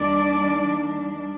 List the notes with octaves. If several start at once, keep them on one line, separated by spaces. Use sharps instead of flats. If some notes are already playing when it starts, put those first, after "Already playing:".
Already playing: D#2 D#3 G3 D4 D5